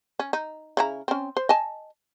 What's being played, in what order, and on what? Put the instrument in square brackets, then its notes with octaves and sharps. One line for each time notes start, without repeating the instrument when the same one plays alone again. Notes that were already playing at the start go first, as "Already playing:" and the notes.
[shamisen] C#4
D#4
C#3 E4 A#5
C4 C#4
C5
D#5 G#5 A5